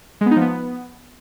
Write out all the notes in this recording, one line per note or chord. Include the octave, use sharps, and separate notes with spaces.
G#3
B3
D#4
F3
B3